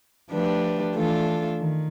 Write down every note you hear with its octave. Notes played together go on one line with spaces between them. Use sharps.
F3 A3 D4 G4 B4
E3 A3 D4 F4 A4
D#3